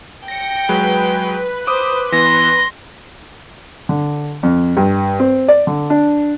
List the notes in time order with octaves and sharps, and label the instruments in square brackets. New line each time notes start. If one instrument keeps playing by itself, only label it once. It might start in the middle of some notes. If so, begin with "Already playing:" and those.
[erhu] G5 [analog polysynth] A#6 C#7
[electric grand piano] F#3 G#3 [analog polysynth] B4
[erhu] C5 [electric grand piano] D6 D#6
[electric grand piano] E3 B3 [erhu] C6 [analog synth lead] A#6
[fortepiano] D3
F2
G2
C4
D5
D3
D4